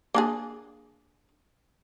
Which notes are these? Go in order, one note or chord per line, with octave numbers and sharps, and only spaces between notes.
A#3 D4 G#4